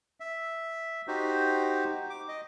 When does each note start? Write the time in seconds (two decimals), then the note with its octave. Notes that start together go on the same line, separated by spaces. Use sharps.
0.20 E5
1.08 D#4 F#4 G4 C5
2.10 D6
2.29 D#5